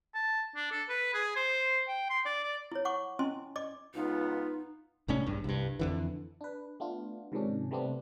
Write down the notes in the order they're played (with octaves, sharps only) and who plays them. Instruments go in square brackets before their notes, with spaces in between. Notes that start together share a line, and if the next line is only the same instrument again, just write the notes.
[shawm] A5
D4
A4
B4
G#4
C5
G5
C6
D5
D5
[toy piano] E4 C#5
F#5 C#6 D6
C#4 E4 D#5 G#5 C6
D5 D#5 D6
[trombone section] C#2 B3 F4 [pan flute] D#4
[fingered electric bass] C2 A2 C#4 D4
A#1 G2
C2 G2
F2 D3 E3
[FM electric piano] D4 B4
A3 B3 D4 F4
G#2 C3 D#3 F3 C#4 D4
C3 G3 A3 B3 C4 D4